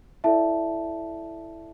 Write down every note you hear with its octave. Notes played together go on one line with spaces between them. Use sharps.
E4 A4 D5 E5 A5